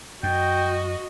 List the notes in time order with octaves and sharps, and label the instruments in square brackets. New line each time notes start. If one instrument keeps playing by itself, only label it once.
[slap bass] F#2 [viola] F#4 D#5 [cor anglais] G5